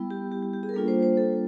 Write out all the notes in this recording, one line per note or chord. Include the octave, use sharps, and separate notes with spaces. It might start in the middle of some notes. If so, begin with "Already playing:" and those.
Already playing: G3 B3 E4
G4
G4
G4
G4
G#4
A#4
G3 A#3 D4 F4 A4
C5
C5
A4